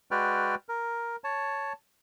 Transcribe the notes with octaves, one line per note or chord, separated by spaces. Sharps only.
G#3 F#4 B4 D5 G5 F6
A#4
C#5 A5